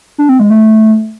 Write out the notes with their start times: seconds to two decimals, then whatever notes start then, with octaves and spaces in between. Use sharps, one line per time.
0.18 D4
0.29 C4
0.39 G#3
0.50 A3